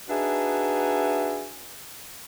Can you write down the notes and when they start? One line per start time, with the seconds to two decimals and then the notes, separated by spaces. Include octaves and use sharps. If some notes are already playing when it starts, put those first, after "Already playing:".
0.09 D4 D#4 F#4 G#4 B4 E5